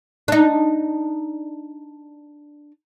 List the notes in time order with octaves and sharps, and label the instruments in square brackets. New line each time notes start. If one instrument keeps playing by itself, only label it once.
[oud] D4 D#4